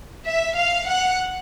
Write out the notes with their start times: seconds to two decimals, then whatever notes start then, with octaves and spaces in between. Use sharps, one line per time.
0.26 E5
0.56 F5
0.87 F#5